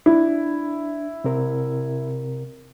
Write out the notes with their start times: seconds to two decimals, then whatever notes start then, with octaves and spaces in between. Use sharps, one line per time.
0.06 D4 E4
1.24 C3 C4 A#4